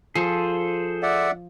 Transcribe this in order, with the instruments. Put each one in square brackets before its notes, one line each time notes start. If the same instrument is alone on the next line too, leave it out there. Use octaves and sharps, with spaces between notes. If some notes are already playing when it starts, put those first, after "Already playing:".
[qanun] F3 [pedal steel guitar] G#4 A4 C5
[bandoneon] D5 E5 F#5